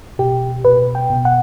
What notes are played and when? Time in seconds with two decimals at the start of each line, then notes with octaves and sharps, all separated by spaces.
0.19 B2 G4
0.65 B2 B4
0.95 G5
1.10 B2
1.25 F#5